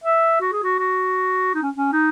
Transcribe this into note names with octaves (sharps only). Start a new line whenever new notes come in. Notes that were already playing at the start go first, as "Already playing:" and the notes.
E5
F#4
G#4
F#4
F#4
D#4
C#4
C#4
D#4